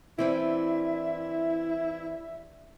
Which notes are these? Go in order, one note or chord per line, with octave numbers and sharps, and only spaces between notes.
E3 G3 C4 D4 E4 E5